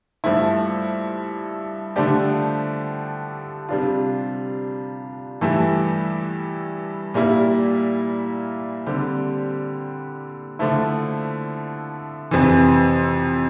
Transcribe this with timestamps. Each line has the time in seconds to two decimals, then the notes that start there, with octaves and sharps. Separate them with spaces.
0.24 G2 F3 A3 E4
1.96 D3 F3 A3 D4 G4
3.69 C3 G3 D4 F4
5.41 G2 E3 A3 E4 G4
7.14 A#2 G3 A#3 E4
8.86 D3 G3 C4 G4
10.59 D3 F3 A3 E4
12.31 F2 C3 E3